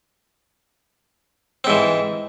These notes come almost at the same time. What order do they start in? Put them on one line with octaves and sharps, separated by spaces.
C4 G#2 E3